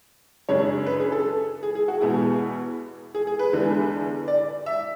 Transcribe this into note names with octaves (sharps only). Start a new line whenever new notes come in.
F#2 C#3 G#3 D4 C#5
B4
G#4
A4
G#4
G#4
F#4
E2 B2 G#3 B3 E4 G#4
G#4
G#4
B4
E2 D3 G#3 D4
D5
E5